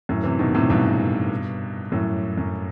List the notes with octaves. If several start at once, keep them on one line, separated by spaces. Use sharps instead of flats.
F#2 A2
C3 E3
B2 D#3
A2 C3
G2 B2
F#2 A2
F#2